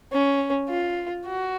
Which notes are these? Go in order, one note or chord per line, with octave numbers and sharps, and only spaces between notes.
C#4
F4
F#4